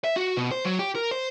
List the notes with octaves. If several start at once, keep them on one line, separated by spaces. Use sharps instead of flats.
E5
F#4
B2
C5
F#3
G4
A#4
C5